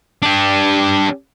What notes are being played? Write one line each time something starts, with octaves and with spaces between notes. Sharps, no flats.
D4 G4